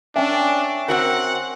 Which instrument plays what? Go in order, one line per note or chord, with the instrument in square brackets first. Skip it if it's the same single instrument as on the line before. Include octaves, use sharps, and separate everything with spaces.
[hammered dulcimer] C#4 G#5 [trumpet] D4 [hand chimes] E5 G5
[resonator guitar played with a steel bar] C4 F#4 A#4 [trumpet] F#5